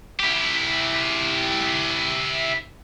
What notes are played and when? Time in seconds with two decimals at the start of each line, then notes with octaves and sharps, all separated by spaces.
0.20 E4 G4